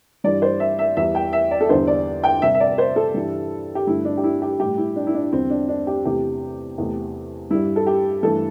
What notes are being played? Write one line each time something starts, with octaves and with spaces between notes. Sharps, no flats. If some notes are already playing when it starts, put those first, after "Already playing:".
G2 E3 G3 D5
C5
E5
E5
E2 E3 G3 E5
G5
E5
D5
A4
E2 D3 G3 C5
D5
G5
C3 G3 E5
E5
D5
C5
A4
G2 E3 G3
G4
G2 D3 A3 E4
D4
G4
E4
G4
A2 G3 G4
E4
D4
E4
D4
E2 D3 G3 C4
D4
D4
G4
E2 C3 A3 G4
E2 C3 A3
G2 G3 E4
A4
G4
G2 E3 A3 A4